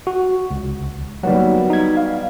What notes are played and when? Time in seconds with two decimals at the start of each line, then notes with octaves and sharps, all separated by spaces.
0.07 F#4
0.51 C#2
1.23 F#3 G3 A#3 B3 D#4 F#4
1.70 D#4 G#6
1.97 F5